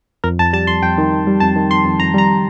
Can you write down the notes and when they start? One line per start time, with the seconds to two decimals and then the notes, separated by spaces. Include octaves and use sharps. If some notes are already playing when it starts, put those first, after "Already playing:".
0.24 F2 A#4
0.39 F2 A5
0.53 G3 A5
0.67 F2 C6
0.82 F2 G5
0.98 D#3
1.12 D#3
1.27 G3
1.40 F2 A5
1.56 D#3
1.71 F2 C6
1.85 F2
2.00 F2 A#5
2.14 G3 A#5